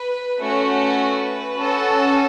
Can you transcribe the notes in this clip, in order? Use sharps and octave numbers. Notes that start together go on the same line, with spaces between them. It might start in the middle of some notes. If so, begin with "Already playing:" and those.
Already playing: B4
A3 C#4 F#4 C#5
B4
C#4 F#4 A4